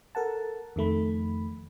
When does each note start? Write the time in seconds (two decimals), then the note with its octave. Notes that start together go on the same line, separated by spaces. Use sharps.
0.15 A4 A#4 F#5 A5
0.76 F2 D#3 A3 B5